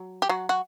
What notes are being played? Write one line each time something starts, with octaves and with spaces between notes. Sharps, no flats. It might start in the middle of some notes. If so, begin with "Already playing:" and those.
Already playing: F#3
G4
F#3 F#4
F#4